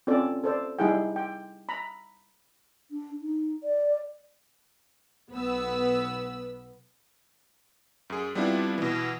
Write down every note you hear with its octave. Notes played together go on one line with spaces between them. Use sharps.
C4 C#4 F4 A4 D5
A4 C5 D5
G3 D#4 E4 G#4 F#5 G5
G5
A#5 B5
D4
D#4
D5
B1 B3 B4 E6
F#2 G#4
G3 B3 C4 D4 E4 F4
B2 E3